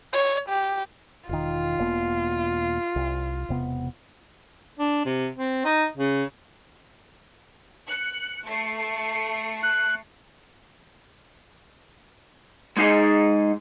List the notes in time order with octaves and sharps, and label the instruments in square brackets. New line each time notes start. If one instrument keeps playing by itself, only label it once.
[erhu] C#5
G4
[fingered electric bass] E1 D#3 [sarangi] F4
[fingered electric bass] E1 A#3 B3
C2
E1 C3 B3
[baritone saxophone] D4
C3
C4
D#4
C#3
[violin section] F#6 C#7
A3 C7 C#7
[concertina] F#6
[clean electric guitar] G#3 D#4 G#4 D#5